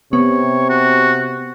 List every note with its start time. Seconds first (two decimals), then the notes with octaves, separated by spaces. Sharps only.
0.13 C3 B3 C#5
0.69 F#4